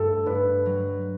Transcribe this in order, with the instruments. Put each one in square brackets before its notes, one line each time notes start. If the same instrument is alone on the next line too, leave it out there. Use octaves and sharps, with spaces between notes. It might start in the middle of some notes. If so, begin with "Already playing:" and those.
Already playing: [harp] G2 A3 [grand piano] A4
[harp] G2 [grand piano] B4
[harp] F#3